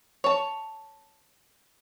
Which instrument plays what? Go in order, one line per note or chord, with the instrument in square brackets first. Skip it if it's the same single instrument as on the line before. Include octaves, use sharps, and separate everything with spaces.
[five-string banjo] C#5 A5